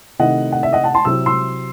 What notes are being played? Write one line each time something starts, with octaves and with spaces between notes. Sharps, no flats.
C3 D#3 A3 C4 E4 D#5 F#5
F#5
E5
D#5 F#5
F#5 A5
A5 C6
C3 F#3 C4 E4 E6
C6 E6